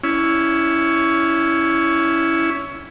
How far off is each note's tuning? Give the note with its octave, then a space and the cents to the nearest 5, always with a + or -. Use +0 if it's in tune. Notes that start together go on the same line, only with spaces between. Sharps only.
C#4 +20 E4 +0